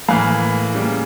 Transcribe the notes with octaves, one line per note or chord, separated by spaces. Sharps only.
A2 E3 A#3 F5
C#3 G3 A#3